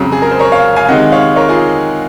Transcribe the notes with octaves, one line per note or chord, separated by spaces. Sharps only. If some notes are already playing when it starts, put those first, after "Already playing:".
Already playing: F2 C#3 F#3
G#4
A#4
C5
A#4 C#5
C#5 F5
F5 G#5
C3 D#3 G#3 D#5 F#5
C#5 F5
A#4 C#5
F4 G#4